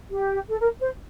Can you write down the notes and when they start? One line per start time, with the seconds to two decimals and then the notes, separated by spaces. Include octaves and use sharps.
0.11 G4
0.50 A4
0.60 A#4
0.80 C5